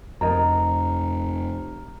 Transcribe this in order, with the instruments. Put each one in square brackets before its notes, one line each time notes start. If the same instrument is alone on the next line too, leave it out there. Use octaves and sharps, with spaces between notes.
[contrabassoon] F1 [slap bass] F2 [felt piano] A#4 D#5 [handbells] A#5